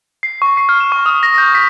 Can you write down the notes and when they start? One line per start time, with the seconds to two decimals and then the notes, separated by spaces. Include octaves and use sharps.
0.23 C7
0.42 C#6
0.57 C7
0.69 F6
0.80 E7
0.92 C#6
1.06 D#6
1.23 A#6
1.38 G6
1.55 B6